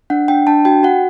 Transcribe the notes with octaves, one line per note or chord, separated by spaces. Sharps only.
D4 F#5
D4 G5
D4 A5
F#4 G5
F#4 F#5